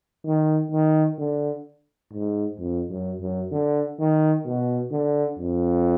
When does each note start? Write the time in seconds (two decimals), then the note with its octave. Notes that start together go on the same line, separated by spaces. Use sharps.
0.25 D#3
0.71 D#3
1.18 D3
2.12 G#2
2.58 F2
2.90 F#2
3.20 F#2
3.51 D3
3.99 D#3
4.45 B2
4.91 D3
5.38 F2